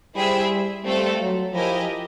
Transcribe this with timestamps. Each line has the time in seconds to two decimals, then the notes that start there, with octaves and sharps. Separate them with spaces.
0.16 G3 E4 G#4 C5 E5 G5
0.85 G3 A3 C4 F4 A4
1.20 F#3
1.54 F3 E4 G4 A#4 D#5 G#5